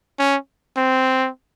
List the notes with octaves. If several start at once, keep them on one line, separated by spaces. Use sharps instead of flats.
C#4
C4